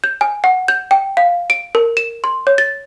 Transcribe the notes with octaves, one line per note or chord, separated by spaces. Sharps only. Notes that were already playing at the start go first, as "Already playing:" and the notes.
G6
G#5
F#5
G6
G5
F5
D7
A#4
E7
C6
C#5
A6